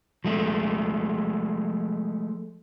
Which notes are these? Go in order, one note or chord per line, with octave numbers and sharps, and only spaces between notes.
F3 G#3 A3